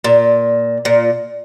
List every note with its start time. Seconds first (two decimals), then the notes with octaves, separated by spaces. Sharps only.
0.04 A#2
0.85 A#2